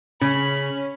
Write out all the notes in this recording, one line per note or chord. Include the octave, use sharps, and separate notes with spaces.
C#3 C#4 B5